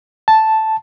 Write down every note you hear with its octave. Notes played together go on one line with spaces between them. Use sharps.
A5